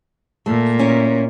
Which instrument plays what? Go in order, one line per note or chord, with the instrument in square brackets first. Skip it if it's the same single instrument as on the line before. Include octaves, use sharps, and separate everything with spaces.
[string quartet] A#2 [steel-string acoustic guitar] A3
[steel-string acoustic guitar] C#4 E4 A#4